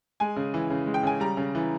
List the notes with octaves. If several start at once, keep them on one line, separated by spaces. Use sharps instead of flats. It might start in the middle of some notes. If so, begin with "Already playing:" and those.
G#3 G#5
C#3
E3
C#3
G#3
G5
C#3 G#5
G3 A#5
C#3
E3